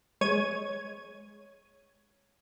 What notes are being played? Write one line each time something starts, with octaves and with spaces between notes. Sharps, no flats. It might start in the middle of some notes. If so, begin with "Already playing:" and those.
G#3 C#5 G#6 D#7